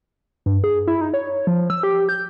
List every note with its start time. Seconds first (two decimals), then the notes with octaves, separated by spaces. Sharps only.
0.46 G2
0.64 G#4
0.87 E4
1.01 D#4
1.14 C#5
1.47 F3
1.70 E6
1.83 G4
2.09 G6